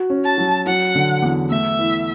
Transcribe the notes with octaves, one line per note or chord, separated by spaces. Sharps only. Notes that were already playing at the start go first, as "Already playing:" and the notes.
Already playing: F#4
C#4
A5
F#3
F#3 F#5
D3
E2
A3 E5
E3